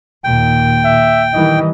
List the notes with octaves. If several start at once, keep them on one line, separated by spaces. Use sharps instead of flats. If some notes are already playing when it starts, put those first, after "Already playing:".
D#2 A#2 G5
E5
D#3 E3 G3 D#5